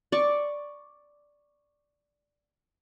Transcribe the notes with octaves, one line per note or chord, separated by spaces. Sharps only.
D5 C#6